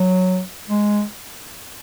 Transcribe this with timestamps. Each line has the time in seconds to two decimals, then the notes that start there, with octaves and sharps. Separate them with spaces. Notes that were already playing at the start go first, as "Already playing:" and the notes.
Already playing: F#3
0.70 G#3